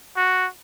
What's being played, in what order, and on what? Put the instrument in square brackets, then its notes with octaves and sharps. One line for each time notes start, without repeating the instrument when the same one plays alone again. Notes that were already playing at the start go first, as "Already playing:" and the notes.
[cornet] F#4